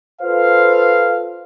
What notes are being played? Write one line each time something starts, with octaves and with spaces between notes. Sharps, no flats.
F4 A4 B4 C5 F5